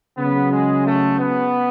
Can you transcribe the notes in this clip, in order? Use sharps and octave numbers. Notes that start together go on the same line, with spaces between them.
C#3 F#3 B3
G#3
A3
B3